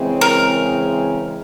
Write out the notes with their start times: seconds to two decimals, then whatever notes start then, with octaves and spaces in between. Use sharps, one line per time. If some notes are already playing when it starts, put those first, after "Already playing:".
Already playing: C#3 E3 G#3 C4
0.21 A#4